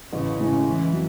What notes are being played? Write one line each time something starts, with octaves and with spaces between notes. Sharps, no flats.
A1 C#3
A2 G#3 C#4
C#3 E3
F#3